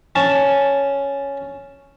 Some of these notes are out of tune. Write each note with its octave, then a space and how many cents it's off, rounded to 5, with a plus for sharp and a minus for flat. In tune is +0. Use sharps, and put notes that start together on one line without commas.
C#4 +5 A5 +0